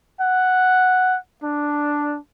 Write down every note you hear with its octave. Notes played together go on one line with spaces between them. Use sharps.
F#5
D4